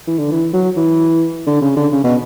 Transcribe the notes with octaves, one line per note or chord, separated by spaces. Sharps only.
E3
D3
E3
F#3
E3
D3
C#3
D3
C#3
B2